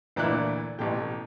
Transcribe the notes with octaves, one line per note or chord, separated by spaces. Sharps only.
D2 A#2 E3 D4 E4 F#6
A1 B2 G4